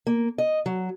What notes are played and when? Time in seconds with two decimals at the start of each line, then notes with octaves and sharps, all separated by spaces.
0.07 A#3
0.38 D#5
0.66 F#3